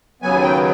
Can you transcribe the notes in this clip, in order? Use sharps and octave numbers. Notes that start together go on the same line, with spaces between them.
D#2 C#3 F#3 B3 G#5
G5